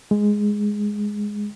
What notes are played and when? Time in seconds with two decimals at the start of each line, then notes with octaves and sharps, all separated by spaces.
0.11 G#3